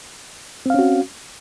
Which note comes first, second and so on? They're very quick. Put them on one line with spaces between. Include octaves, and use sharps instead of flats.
C4 F5 C#4 F#4